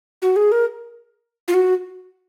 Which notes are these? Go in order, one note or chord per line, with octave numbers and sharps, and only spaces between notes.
F#4
G#4
A#4
F4
F#4